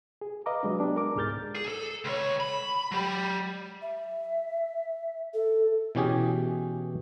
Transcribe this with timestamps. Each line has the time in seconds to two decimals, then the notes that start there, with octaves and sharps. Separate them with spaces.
0.21 G#4
0.46 B4 D#5 F5 A#5 D6
0.63 F#3 G#3 D4
0.80 B3 D4 G4
0.96 A#4 D6
1.15 C#2 G#2 G#4 F6 G6 A6
1.55 G#4
1.68 A4
2.05 C#2 C#5
2.40 B5
2.92 F#3 G4
3.82 E5
5.34 A4
5.95 B2 E3 C#4 G4 G#4